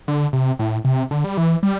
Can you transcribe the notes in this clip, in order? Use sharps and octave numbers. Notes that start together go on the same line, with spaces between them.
D3
C3
A2
C3
D3
G3
E3
G3